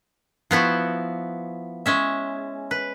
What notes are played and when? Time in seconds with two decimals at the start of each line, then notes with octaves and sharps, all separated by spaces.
0.51 F3 B3 E4 F#4
1.86 G#3 C#4 E5
2.71 B4